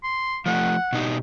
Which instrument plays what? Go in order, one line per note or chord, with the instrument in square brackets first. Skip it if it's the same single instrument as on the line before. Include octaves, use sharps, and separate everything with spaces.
[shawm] C6
[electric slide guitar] F3 A3 [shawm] F#5
[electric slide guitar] B2 D#4 G4